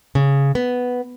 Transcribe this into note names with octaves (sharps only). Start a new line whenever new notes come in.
C#3
B3